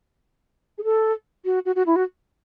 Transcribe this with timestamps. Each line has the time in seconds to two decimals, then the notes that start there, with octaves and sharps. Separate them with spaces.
0.78 G#4
0.84 A4
1.45 F#4
1.65 F#4
1.76 F#4
1.86 E4
1.96 F#4